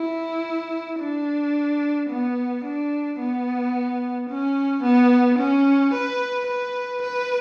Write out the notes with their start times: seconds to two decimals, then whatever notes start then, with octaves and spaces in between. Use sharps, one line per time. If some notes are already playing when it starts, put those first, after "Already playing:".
Already playing: E4
1.00 D4
2.09 B3
2.65 D4
3.20 B3
4.29 C#4
4.83 B3
5.38 C#4
5.93 B4
6.47 B4
7.02 B4